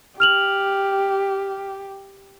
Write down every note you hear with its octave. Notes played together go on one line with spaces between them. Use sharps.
G4 F6 F7 F#7